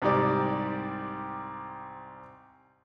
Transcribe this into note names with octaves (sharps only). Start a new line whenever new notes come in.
C2 G#2 G3 G4 D5